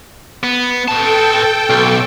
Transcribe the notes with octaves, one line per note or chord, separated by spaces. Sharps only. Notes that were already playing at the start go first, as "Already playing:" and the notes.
B3
A4 B4 G5 A5
B1